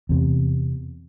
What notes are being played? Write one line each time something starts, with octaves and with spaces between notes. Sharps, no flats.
E2 C3